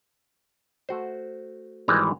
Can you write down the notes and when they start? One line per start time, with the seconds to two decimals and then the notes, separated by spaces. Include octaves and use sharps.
0.89 A3 F#4 C5
1.88 G#1 E3 G3 G#3 A#5